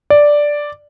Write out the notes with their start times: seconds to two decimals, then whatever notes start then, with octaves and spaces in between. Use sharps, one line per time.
0.10 D5